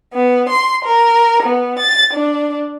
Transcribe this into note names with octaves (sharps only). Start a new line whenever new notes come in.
B3
C6
A#4
B3
A6
D4